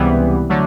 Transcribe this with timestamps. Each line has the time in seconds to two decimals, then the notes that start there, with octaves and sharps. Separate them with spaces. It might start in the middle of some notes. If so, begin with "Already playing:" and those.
Already playing: C#2 C3 E3 G3 B3
0.49 D3 F#3 A3